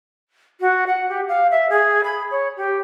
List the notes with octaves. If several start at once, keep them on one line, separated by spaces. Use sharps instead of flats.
F#4
F#5
G4
F5
E5
G#4
B5
C#5
G4